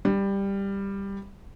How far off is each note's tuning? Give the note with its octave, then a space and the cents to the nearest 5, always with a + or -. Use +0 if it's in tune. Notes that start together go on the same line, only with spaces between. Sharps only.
G3 +10